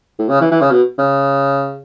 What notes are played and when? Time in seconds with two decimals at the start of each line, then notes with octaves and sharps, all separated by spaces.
0.19 A2
0.29 C#3
0.41 E3
0.51 E3
0.61 C#3
0.71 B2
0.98 C#3